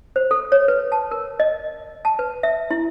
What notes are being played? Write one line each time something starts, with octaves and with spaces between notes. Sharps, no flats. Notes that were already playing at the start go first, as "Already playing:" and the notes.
C5
A4
C#5
B4
A5
A#4
D#5
A5
B4
E5
E4